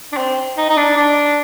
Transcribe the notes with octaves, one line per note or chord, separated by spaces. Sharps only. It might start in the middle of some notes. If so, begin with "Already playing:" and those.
D4
C4
D#4
D#4
D4
D4